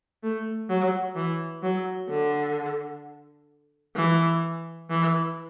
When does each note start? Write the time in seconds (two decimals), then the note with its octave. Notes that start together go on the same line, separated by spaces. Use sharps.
0.23 A3
0.70 F#3
1.16 E3
1.63 F#3
2.10 D3
3.96 E3
4.90 E3